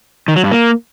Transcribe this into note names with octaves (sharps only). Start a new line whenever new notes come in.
D#3
F#3
G2
A#3